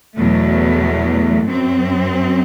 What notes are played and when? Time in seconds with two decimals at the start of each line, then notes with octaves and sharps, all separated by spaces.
0.17 E2 B2 F#3 A3
1.47 F#2 F#3 C4